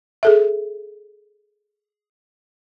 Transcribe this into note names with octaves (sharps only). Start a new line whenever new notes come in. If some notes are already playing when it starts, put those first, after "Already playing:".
G#4 A4 E5